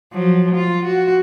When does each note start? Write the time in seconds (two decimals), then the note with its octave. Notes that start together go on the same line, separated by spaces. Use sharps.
0.13 F3 F#3
0.56 F4
0.85 F#4